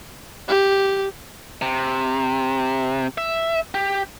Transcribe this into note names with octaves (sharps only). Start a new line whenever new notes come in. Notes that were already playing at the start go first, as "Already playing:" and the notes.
G4
C3
E5
G4